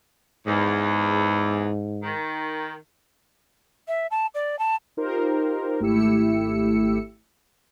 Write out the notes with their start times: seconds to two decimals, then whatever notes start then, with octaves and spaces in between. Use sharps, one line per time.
0.46 E2 G#2
2.02 D#3
3.88 E5
4.11 A5
4.34 D5
4.59 A5
4.97 D#4 F4 G4 A#4 C5
5.80 G#1 A3 E4 G4 E6 C#7